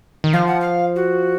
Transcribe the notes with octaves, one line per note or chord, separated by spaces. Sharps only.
D#3
F3 F5
F#5
F5
F#4